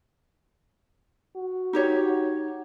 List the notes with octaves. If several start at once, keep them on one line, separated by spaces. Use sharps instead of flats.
F#4
D#4 G4 C#5